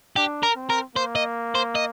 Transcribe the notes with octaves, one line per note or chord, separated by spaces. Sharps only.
D4 G4
A#4
C4
A#4
A#3 C5
D#5
C5
D#5